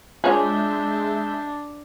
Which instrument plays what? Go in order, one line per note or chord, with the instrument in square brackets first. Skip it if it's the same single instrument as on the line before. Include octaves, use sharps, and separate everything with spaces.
[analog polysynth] G#3 E5 G6 [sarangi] D4 [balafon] F4 [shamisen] G#4 C#5